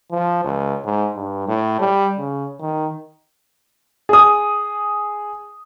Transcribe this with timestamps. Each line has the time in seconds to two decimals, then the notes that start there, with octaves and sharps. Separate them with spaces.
0.11 F3
0.44 C#2
0.84 G#2
1.16 G2
1.48 A2
1.80 G3
2.18 C#3
2.60 D#3
4.09 G#4 D#6